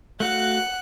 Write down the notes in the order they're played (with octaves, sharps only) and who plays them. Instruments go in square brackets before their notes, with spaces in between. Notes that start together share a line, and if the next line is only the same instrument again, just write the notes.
[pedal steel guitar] A3 F#4 F5 [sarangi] F#5 [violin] F#6 C#7